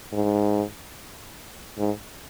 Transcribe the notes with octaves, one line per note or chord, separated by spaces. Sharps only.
G#2
G#2